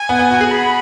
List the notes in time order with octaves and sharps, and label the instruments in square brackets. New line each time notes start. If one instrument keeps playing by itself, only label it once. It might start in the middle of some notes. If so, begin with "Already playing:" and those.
Already playing: [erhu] G#5
[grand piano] B3
B3
F#4
G#4
[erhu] B5